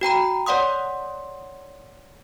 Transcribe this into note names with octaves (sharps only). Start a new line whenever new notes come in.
F#4 G5 A#5 B5
C#5 D5 F#5 C6 D#6